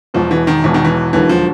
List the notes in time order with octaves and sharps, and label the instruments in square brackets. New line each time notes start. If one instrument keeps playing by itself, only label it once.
[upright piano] E1 E2 B2 [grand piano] F3
[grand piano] E3
D#3
[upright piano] E1 E2 B2 [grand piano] E3
[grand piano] D#3
E3
[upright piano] E1 D#2 D3 F#3 [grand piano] E3
[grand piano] F3